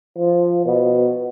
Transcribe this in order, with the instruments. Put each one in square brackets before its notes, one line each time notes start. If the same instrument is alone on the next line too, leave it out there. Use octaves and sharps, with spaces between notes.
[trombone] F3
B2